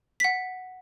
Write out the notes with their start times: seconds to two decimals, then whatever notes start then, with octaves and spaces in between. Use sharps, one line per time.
0.20 F#5 B6